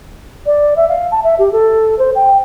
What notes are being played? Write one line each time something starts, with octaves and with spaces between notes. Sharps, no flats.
D5
E5
F5
A5
E5
G4
A4
C5
G5